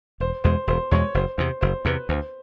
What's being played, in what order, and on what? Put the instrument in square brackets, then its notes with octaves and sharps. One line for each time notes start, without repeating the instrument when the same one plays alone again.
[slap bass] E1 [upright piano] C5
[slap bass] E2 B2 G#3 [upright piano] C5
[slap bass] E1 [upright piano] C5
[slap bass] E2 B2 G#3 [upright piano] C#5
[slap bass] F#1 [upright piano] C5
[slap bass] E2 C3 [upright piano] C5
[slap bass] F#1 [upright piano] C5
[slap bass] E2 C3 [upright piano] B4
[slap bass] D2 [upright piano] C5